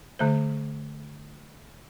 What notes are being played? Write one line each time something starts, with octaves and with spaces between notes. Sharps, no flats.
D3 A3 C5